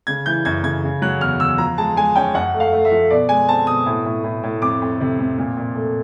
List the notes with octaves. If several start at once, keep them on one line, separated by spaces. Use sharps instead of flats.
C#3 G#6
E3 G6
F#2 G#6
C#3 G#6
C#3
F#3 F#6
E2 F6
E2 E6
F3 A#5
G#3 A5
G#3 G#5
C#4 G5
F#2 F#5
A3
F5
A3
E5
F3
B2 D5
G#3 G#5
C4 A5
B2 D#6
A2
A2
A2
A2
F2 D6
F2
C3
F2
A#2
A#2
A3